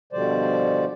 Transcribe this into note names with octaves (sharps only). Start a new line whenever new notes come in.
B2 D3 F3 G3 C5 D5